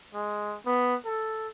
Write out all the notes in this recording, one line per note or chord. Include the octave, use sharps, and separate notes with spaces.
G#3
B3
A4